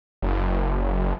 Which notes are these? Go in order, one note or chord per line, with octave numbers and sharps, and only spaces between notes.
F#1